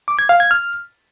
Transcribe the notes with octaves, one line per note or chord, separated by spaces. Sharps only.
D6
G#6
F5
G#6
F6